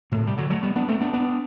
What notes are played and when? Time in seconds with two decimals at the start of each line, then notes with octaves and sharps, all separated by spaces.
0.12 A2 C3
0.27 G3
0.37 D3 F#3
0.50 F#3 A3
0.63 G3 B3
0.76 B3 D4
0.88 A3 C4
1.00 B3 D4
1.13 B3 D4